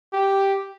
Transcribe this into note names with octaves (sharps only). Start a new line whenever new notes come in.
G4